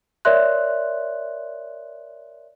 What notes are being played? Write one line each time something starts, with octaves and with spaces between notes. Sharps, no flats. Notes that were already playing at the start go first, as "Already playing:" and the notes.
A#4 C#5 D5 E5 C6 F#6